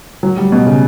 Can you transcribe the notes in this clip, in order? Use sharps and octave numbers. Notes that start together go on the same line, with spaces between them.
F#3
G3
B2
C#3